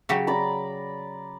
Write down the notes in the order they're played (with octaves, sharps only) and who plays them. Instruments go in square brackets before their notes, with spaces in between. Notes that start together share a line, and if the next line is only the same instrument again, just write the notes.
[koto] C#3 F#3 G4
[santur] D5 A#5 B5